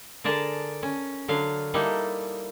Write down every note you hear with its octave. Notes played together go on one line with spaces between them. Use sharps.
D3 G#4 A#4 D5 A5
C#4
D3 F#3 F5
G3 A#3 D#4 E4 A4